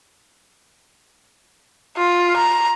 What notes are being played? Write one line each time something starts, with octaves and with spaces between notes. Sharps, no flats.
F4
A#5